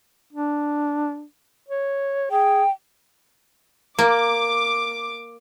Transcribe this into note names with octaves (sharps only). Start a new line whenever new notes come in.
D4
C#5
G#4 G5
A#3 D6